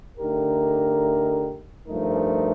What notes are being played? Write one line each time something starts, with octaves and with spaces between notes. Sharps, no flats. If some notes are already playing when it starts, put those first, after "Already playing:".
D3 A3 D#4 G4 A#4
G2 F3 A3 D#4 A#4